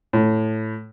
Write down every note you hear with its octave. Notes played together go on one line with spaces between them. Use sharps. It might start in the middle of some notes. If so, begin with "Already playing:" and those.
A2